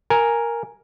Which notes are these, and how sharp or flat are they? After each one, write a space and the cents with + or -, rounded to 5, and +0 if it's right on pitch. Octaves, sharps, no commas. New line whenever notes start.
A#4 +0 G#5 +0